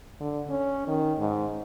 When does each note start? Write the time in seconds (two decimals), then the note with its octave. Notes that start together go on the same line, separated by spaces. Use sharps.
0.20 D3
0.49 C#4
0.87 D#3
1.18 G#2